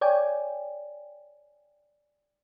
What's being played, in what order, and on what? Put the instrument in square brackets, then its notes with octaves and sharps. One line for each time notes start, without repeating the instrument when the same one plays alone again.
[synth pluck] C#5 D5 G5 G#5